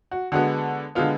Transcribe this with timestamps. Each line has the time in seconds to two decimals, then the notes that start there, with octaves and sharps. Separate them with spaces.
0.11 F#4
0.32 D3 G#3 B3 F#4
0.95 D3 G#3 B3 F4